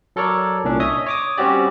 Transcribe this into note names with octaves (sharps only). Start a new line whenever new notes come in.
F#3 A4 A#4 C#5 D5
C2 A#2 C#4 D4
C#5 D#5 E5 D#6
C#5 D6 D#6
G3 C4 C#4 F#4 G4 D5